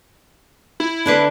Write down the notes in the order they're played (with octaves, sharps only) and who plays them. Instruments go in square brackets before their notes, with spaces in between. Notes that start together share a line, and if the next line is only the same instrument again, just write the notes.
[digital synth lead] E4
[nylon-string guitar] D3 D4 B4